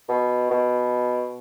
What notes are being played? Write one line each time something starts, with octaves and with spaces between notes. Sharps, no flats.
B2
B2